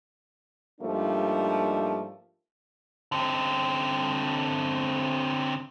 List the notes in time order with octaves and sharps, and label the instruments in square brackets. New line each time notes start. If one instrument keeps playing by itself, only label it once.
[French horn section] G#2 F3 G3 A3 A#3 D4
[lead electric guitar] D3 C4